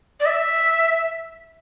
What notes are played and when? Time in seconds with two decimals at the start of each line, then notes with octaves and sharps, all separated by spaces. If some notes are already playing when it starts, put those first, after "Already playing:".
0.20 D5
0.26 E5